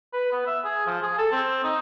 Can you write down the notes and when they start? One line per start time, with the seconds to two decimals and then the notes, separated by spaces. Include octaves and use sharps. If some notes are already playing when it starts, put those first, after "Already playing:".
0.13 B4
0.32 B3
0.47 E5
0.64 G#4
0.87 F3
1.02 G#4
1.18 A4
1.32 C4
1.64 D#4